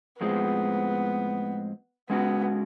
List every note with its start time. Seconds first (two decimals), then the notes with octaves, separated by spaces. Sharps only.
0.20 A2 F3 G#3 B3 C4
2.10 G#3 B3 C#4 F#4